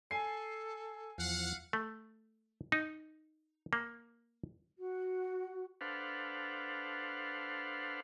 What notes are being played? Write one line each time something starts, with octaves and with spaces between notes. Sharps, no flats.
A4 G#5 C7
E2 F3 F5 F#5
A3
D#4
A#3
F#4
D4 A4 B4 C5 F5 F#5